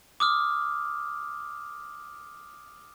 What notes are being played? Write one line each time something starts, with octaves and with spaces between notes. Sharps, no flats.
D6 D#6 F6